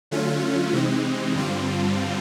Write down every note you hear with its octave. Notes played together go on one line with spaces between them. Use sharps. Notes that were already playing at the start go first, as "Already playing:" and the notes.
D3 F#3 A3 C#4 F4
C3 E3 G#3 C4 D#4
G2 D3 G3 C4 F4